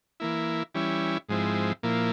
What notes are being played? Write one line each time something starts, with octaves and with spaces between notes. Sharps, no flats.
E3 A#3 E4
E3 G3 C#4 E4
G#2 F3 G#3 C4 E4
A#2 F3 A#3 E4